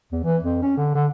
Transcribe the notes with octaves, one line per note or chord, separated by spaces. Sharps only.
E2
E3
F2
C#4
D3
D3